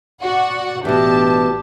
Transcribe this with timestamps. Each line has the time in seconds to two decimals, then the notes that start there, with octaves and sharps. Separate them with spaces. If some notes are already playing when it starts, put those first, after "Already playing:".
0.22 F#4 D5 F#5
0.85 A1 B2 E3 D4 G4 A5